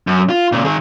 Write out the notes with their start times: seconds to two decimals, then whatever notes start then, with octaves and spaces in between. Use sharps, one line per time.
0.07 F#2
0.29 F4
0.52 A#2 C#3
0.65 D#3 G#4